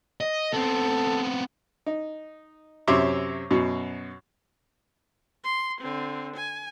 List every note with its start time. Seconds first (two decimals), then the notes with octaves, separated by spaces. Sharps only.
0.21 D#5
0.53 B3 C4 A4
1.86 D#4
2.87 F#2 C3 C#5 E5 C6 D6
3.51 F#2 B2
5.44 C6
5.81 D3 C4
6.36 G#5